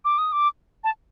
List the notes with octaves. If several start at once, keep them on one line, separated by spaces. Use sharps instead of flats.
D6
D#6
D6
A5